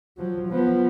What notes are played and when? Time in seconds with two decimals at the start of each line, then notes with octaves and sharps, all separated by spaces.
0.17 F3 F#3
0.48 F3 B3